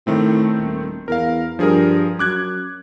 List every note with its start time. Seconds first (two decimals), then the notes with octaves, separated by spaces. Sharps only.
0.07 A2 D#3 A3 C4
0.58 D#1
1.08 E2 A#4 F5
1.59 G2 F3 G#4 A#4
2.19 F#2 D6 F#6 G#6